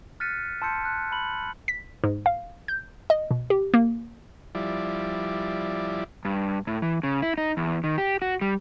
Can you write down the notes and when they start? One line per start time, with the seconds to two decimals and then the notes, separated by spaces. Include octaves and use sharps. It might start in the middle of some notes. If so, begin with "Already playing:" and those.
0.20 F6 F#6 A6 B6 C#7 D#7
0.62 A5 C6 E6 G6 C#7
0.85 F#6
1.11 A5 B5 F#7
1.68 B6
2.04 G#2
2.26 F5
2.68 G6
3.10 D#5
3.31 B2
3.50 G4
3.74 A#3
4.55 F3 G3 E4 D5
6.25 G2
6.67 A2
6.82 E3
7.03 C#3
7.22 E4
7.38 D#4
7.57 E2
7.84 D#3
7.98 G4
8.22 F#4
8.41 G3